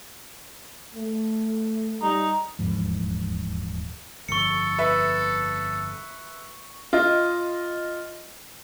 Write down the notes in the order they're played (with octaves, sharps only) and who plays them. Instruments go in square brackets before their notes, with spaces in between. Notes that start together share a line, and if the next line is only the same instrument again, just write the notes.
[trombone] A3
[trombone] G3 [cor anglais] D#4
[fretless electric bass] D#1 E2 G#2 F3
[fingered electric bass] G1 F2 [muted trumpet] A4 [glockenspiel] C#6 C#7
[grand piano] B4 E5
[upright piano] F4 D#5